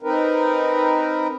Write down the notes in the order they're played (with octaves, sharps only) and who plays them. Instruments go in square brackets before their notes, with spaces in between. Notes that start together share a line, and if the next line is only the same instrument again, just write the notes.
[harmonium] C4 D#4 A#4 B4